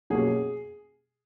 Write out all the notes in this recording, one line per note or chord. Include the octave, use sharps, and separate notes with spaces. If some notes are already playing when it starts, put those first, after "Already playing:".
B2 F#3 A#3 C#4 G#4